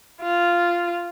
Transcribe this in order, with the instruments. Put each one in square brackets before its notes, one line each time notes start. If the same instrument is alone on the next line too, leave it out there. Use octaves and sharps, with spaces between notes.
[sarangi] F4